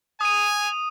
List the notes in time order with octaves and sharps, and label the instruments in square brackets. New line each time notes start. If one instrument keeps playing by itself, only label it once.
[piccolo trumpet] G#5 [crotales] D#6 D#7